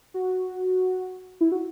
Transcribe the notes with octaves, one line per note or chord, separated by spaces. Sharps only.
F#4
E4
F#4